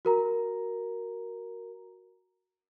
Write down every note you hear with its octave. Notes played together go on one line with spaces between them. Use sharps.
F#4 A#4 A#5